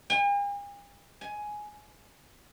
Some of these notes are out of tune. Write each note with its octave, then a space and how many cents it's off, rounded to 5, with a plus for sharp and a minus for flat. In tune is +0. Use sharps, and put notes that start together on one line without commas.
G#5 -45
G#5 +10